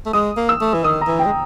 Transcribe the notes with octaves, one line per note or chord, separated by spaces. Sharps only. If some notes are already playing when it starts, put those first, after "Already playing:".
A3
G#3 D#6
A#3
E6
A3
E3
D#3 D#6
A#5
E3
G5
G#3